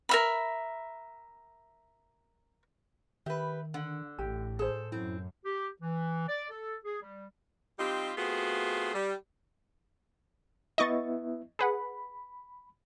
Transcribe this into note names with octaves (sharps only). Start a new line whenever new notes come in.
A#4 E5 B5
D#3 G4 B4 E5
D3 F#5
A1 A2 G4
G#4 A4 C5
F#2 C4 E4
G4
E3
D5
A4
G#4
G3
G3 C4 D#4 F4 G4
A3 B3 C4 F4 F#4 G#4
G3
B3 E4 D#5 E5 C#6 A6
G#4 B4 F#5 B5